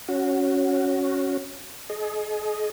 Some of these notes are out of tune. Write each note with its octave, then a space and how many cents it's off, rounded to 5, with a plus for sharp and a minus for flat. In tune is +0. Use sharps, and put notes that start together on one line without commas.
C#4 +0 F#4 +0
G#4 +40 D#5 +0